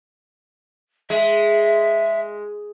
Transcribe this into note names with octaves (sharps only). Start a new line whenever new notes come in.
G#3 E5